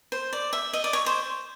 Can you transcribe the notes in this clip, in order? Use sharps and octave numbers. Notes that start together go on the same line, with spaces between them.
C5
D5
E5
D#5
D5
C#5
C5